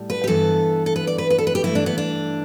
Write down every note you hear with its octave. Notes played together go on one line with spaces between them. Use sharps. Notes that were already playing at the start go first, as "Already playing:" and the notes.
Already playing: A2 G3
B4
G4
G2 E3 B3 A4
A4
B4
D5
B4
B4
A4
B4
G4
G2 E3 A3 E4
D4
B3
D4